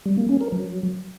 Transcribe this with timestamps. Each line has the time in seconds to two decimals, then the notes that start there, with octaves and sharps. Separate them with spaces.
0.06 G3
0.17 A#3
0.29 C#4
0.41 A#4
0.52 F#3